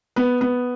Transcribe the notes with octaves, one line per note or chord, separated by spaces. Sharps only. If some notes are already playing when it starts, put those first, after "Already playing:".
B3
B3